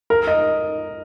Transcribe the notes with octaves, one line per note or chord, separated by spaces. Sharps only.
A#4
D#5